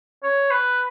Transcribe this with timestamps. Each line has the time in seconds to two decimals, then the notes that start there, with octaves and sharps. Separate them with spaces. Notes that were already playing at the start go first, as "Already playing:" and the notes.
0.23 C#5
0.51 B4